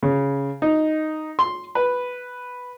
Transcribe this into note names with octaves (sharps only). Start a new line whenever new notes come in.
C#3
D#4
C6
B4